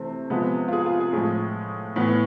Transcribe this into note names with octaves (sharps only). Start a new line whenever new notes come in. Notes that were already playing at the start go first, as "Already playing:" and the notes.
Already playing: C3 E3 A3 C4 C5
C3 F3 G#3 B3
F4
G#4
F4
G#4
A2 F3 G#3 G#4
A2 E3 B3